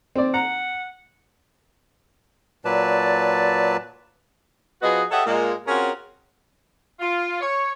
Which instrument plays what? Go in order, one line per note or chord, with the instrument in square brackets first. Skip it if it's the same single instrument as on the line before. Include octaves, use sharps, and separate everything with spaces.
[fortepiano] C4 D5
[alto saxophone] F#5 [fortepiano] A#5
[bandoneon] A#2 F#3 B4 D5 A5
[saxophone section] F3 B3 F#4 G#4 B4 D#5
G4 A4 C#5 D#5 E5 F#5
A#2 G#3 A#3
C4 C#4 F4 F#4 G#4 A#4
[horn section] F4
C#5